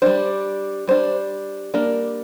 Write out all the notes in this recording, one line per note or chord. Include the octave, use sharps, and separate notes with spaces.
G3 D4 C5
G3 D4 C5
G3 A#3 D4 A#4